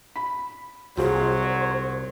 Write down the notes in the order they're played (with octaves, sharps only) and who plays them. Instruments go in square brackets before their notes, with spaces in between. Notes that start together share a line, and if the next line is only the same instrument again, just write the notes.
[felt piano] B5
[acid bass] C2 [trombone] F#3 [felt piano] F4 G#4 [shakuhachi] C5